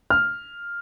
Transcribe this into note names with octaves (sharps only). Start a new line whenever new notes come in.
F6